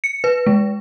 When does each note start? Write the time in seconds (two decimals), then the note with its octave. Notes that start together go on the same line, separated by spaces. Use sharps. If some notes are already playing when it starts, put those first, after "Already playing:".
0.04 C#7
0.24 B4
0.47 G#3